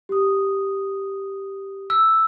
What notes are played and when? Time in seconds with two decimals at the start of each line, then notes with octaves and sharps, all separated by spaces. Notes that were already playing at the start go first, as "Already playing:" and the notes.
0.09 G4 D#6
1.90 E6